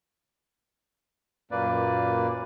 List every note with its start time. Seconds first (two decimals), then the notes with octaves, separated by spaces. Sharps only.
1.51 F#2 A#2 A#3 B4 D5